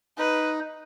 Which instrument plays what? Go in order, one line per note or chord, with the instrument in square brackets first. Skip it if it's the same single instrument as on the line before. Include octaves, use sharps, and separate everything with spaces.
[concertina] D#4 [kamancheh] B4